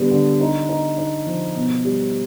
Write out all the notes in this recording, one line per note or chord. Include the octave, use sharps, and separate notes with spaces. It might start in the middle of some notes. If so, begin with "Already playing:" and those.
Already playing: D3 G3 B3
D3
D#4
D#4
D#4
F3
B2
G3